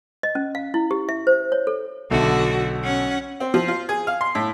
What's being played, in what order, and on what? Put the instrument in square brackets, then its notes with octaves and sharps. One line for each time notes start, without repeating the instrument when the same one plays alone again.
[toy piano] D#5
C#4
F5
E4
G4
E5
C5
C#5
A4
[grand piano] B1 A4 E5 [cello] D3 F#4
[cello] C#4 F#5
[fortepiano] C4
F3
F4
G#4
F5
C6
A2